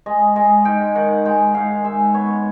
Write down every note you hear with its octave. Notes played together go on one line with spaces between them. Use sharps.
G#3 D#5
G#3 D#5
G#2 G5
D#3 F#5
G#3 G5
G#2 F5
G#3 E5
B3 C#5